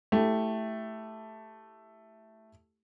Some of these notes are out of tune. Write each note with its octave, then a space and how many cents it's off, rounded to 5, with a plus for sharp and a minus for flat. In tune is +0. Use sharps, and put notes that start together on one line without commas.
A3 +0 E4 +0 G4 +0